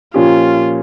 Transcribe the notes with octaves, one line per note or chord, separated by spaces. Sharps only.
A#2 F3 A#3 C#4 F4 G4